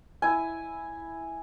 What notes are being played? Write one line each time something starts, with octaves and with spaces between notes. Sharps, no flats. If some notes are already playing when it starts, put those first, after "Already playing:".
E4 G#5